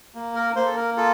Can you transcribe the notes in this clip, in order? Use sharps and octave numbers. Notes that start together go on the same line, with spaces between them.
A#3
A#4
A#3 C5
A4
A#4
F4 A4